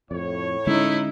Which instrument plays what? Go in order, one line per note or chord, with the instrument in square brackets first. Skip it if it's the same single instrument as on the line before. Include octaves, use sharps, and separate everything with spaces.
[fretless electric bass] F2 [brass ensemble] A2 C#5
[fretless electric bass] D3 G#3 C#4 [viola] D#4 E4